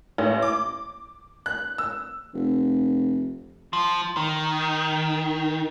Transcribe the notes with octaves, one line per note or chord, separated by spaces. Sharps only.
A1
D6
F#6
E6
F1
F3
D#3